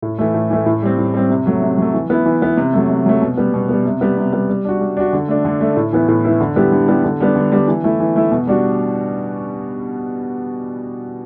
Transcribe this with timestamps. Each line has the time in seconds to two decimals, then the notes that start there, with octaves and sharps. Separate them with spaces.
0.02 A2
0.18 E3 A3
0.34 A2
0.50 E3 A3
0.66 A2
0.82 G3 C4
0.98 A2
1.14 G3 C4
1.30 C3
1.46 F#3 A3
1.62 C3
1.78 F#3 A3
1.93 E3
2.10 B3 E4
2.26 E3
2.42 B3 E4
2.57 C3
2.74 F#3 A3
2.90 C3
3.06 F#3 A3
3.22 B2
3.37 G3 B3
3.54 B2
3.69 G3 B3
3.85 C3
4.01 G3 B3
4.17 C3
4.33 G3 B3
4.49 G3
4.65 D4 F#4
4.81 G3
4.97 D4 F#4
5.13 D3
5.29 A3 D4
5.45 D3
5.61 A3 D4
5.77 A2
5.93 E3 B3 E4
6.08 A2
6.24 E3 B3 E4
6.41 D3
6.56 G3 B3 E4 G4
6.72 D3
6.88 G3 B3 E4 G4
7.04 D3
7.20 G3 B3 D4
7.36 D3
7.52 G3 B3 D4
7.68 E3
7.84 A3 E4
8.00 E3
8.16 A3 E4
8.31 B2
8.47 G3 D4 F#4